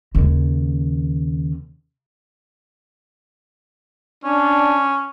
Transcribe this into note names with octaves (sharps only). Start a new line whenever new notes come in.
D#2 C#3
C#4 D4